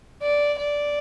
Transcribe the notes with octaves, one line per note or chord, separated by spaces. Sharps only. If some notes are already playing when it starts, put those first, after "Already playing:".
D5
D5